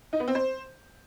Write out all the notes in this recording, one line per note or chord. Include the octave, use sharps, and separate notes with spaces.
D#4
B3
C4
C5